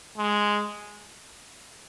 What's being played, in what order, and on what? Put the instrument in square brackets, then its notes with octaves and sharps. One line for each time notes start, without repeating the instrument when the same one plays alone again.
[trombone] G#3